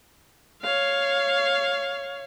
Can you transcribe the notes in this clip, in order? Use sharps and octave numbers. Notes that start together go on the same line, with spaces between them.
C#5 F5